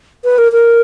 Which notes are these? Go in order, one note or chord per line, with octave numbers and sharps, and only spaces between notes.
B4
A#4
A#4